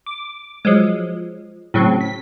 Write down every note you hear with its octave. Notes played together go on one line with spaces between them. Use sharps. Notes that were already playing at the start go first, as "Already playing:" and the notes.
D6
F3 F#3 G#3
A2 C#3 F#3 C4
B6